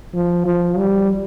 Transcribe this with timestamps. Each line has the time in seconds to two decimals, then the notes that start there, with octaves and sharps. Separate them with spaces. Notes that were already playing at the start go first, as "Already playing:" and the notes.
0.14 F3
0.46 F3
0.77 G3